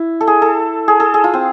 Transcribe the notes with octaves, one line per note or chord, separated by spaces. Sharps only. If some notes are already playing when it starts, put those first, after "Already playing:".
Already playing: E4
A4
G#4
A4
G#4
A4
G#4
F4
C4